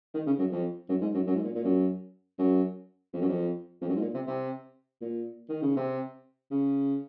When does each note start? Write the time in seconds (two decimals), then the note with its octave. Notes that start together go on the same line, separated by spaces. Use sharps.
0.14 D#3
0.26 C#3
0.39 F#2
0.52 F2
0.89 F#2
1.01 G#2
1.14 F#2
1.27 F#2
1.35 G#2
1.44 A#2
1.55 A#2
1.64 F#2
2.39 F#2
3.13 F2
3.22 F#2
3.29 F2
3.81 F2
3.89 F#2
3.95 G#2
4.01 A#2
4.14 C3
4.27 C3
5.01 A#2
5.49 D#3
5.62 C#3
5.77 C3
6.51 C#3